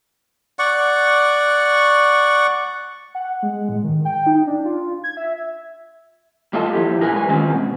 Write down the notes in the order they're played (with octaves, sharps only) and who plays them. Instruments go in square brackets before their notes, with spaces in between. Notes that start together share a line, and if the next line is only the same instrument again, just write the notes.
[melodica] D5 F#5 C#6
[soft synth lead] F#5
G#3
A2
D#3
G5
D#4
D4
F4
G#6
E5
[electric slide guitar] A2 A#3 F4 A4 D#5 A5
F3 E4 G4
A#2 D#4 A#4 B4 G#5
G#3 B4 G#5
D#3 G#3 A#3 C4 C#4 F4
B2